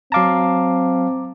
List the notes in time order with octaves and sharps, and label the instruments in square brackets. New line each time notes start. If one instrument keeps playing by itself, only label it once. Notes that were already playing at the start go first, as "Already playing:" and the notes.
[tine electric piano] F#3 F5 A5 [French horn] C4 [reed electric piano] A#5 D6